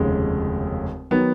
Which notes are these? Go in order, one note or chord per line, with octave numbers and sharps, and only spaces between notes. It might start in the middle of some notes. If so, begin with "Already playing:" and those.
Already playing: F1 D#2 C#3 G#3
D#3 F#3 B3